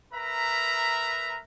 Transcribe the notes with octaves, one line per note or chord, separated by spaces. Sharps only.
A#4 B4 E5 A#5